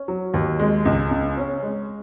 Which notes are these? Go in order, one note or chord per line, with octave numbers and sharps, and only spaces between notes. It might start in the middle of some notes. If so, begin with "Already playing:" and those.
Already playing: C#4
F#3
D#2
G#3
C#2
C#3
C#4
G#3